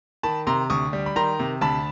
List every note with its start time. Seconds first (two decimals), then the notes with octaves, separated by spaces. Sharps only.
0.23 D#3 A5 B5
0.47 C3 A#5 C6
0.70 D2 C#6 D#6
0.93 G3
1.06 B5
1.16 D#3 A#5 C6
1.40 C3
1.61 D2 A5 B5